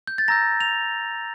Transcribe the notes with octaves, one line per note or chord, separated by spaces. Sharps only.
G6
A6
A#5 E6 G6 A#6
F7